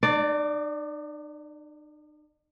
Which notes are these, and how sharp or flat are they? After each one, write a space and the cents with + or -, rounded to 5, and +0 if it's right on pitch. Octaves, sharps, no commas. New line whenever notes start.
D#4 -45 D5 +0